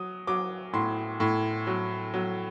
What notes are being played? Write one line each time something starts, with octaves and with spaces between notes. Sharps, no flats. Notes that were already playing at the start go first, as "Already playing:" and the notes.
Already playing: F#3 D#6
F#3 D6
A2 C6
A2
F#3
F#3